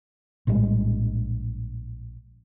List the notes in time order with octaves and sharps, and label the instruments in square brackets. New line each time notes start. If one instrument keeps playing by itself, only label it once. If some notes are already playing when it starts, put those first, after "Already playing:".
[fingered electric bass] A#1 A2 G3 G#3